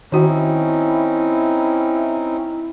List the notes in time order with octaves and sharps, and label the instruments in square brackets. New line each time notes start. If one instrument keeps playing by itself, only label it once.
[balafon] D#3 F#4 [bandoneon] C4 C#4 D#4 [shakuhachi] E4